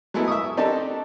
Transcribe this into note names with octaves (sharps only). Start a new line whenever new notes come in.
F#3 G#3 A3 B3 E4
E5 C#6 D#6
C4 D4 D#4 G4 A4 A5